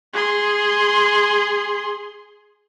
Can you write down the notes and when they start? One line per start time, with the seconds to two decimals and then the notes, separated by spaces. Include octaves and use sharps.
0.13 G#4 C6